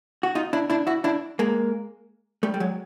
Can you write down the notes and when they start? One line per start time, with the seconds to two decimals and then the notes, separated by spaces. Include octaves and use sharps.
0.23 F#4
0.35 D#4 F4
0.53 D4 E4
0.70 D4 E4
0.87 E4 F#4
1.04 D4 E4
1.39 G#3 A#3
2.43 G3 A3
2.54 G3
2.60 F#3 G#3